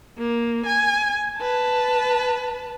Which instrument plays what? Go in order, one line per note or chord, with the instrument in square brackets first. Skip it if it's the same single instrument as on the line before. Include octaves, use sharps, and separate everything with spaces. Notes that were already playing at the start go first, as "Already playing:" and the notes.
[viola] A#3
G#5
B4 A5